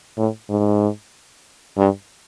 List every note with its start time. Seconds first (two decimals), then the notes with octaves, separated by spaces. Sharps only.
0.18 A2
0.50 G#2
1.78 G2